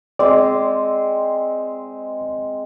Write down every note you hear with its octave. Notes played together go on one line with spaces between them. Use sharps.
G#3 C4 D5